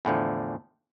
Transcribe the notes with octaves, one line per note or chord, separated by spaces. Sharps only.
E2 A2 D3 F3